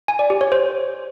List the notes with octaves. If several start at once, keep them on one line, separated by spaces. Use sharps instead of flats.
G#5
D5
G4
C#5
C5